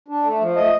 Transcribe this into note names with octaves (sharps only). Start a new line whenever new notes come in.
D4
A3
F3
A3 D#5